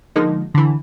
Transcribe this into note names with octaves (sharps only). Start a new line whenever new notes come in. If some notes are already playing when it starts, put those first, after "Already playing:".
D3 F3 G#3 A#3 D#4
D3 E3